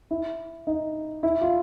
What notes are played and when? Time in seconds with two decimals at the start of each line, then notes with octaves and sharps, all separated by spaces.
0.11 E4
0.67 D#4
1.23 E4
1.41 F4